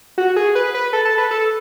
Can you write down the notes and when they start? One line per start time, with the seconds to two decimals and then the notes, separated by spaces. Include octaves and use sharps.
0.18 F#4
0.36 G#4
0.55 B4
0.75 B4
0.93 A4
1.05 A4
1.18 B4
1.31 A4